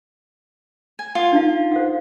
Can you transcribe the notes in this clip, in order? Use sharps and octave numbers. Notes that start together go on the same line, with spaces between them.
G#5
F4 F#5
D4 D#4 F5
C5 F5 F#5